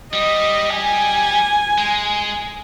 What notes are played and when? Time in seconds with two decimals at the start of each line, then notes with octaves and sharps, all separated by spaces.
0.13 G3 D#5
0.76 G#5
1.78 G#3